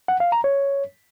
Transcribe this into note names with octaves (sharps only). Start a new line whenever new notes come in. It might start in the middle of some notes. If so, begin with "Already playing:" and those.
F#5
F5
A#5
C#5